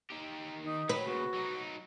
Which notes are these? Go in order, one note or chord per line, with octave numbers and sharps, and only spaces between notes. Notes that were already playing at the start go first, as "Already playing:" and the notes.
D#3 G4
D#4
F#3 B4
A#2 C#3 F#4
F#3 D#4